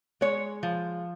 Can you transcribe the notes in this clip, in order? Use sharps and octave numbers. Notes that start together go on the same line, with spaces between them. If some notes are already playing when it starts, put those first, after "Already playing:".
G#3 C#5
F3